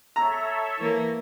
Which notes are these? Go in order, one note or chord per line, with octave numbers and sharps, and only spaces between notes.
A4 C#5 E5 A#5
E3 A#3